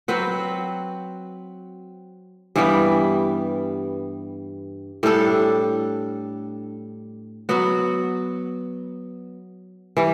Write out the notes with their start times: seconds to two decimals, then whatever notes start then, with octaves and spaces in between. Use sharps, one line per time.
0.08 F#3 C4 F#4 B4
2.56 G2 E3 G3 B3
5.03 A2 G3 D4 A4
7.49 F#3 B3 F#4
9.97 E3 G3